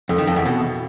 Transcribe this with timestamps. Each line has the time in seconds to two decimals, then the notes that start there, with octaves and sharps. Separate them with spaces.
0.09 F2
0.18 D#3
0.27 F2
0.36 E2
0.45 B2